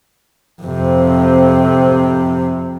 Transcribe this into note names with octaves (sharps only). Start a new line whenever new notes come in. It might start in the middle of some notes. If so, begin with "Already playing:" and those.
F2 C3